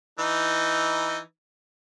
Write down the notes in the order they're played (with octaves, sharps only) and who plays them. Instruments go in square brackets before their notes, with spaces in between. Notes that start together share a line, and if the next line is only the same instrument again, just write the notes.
[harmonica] E3 D#4